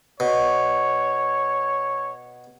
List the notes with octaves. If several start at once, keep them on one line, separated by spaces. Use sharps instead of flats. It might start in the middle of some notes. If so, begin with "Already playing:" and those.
B2 C#5